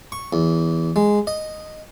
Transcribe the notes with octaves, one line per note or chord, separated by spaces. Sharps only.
C#6
E2
G#3
D#5